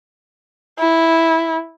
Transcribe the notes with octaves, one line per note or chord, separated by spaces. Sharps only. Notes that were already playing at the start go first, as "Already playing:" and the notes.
E4